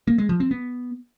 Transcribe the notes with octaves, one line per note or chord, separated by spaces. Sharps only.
A#3
G#3
F3
C4
B3